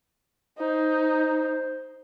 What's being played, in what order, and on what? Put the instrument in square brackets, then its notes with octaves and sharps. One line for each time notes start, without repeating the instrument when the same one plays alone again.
[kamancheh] D#4 [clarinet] C5